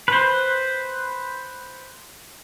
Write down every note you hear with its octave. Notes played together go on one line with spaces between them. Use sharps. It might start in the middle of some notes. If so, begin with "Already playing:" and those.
B4 C5